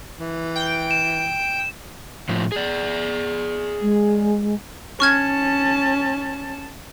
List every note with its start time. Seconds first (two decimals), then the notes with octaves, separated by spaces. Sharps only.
0.19 E3
0.56 G5
0.91 E7
2.29 A2 F3
2.52 G#4 D5
3.82 G#3
5.00 C#4 A5 C#6 F6 G#6